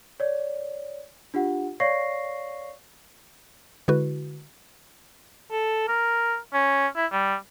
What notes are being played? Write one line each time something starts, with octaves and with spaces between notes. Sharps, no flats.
C#5 D5
D4 F4 G4 F#5
C#5 D5 F5 C#6 A#6 C7
D3 G#3 E4 F#4 B4
A4
A#4
C#4
E4
G3